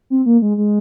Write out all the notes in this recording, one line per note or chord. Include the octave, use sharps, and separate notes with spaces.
C4
A#3
G#3
G#3